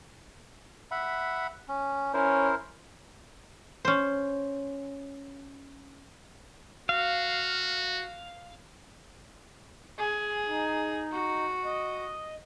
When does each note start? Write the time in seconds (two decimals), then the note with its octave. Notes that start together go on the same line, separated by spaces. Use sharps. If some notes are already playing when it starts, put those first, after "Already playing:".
0.91 E5 F#5 B5
1.68 C#4
2.14 C#4 E4 A#4 C5
3.85 C#4 C5
6.89 F#4 F5
9.99 G#4
10.47 D#4
11.12 F#4
11.65 D#5